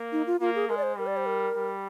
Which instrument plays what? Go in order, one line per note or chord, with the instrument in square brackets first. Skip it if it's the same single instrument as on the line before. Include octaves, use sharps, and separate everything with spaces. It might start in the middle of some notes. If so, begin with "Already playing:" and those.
Already playing: [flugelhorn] A#3
[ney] D#4
F4
[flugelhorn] A#3 [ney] F4
[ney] G#4
[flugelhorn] G#3 [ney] A#4
[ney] D5
C5
[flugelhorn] G3 [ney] A#4
[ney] D5
C5
A#4
[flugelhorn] G3